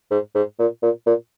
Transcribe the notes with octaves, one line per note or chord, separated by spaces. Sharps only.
G#2
G#2
A#2
A#2
A#2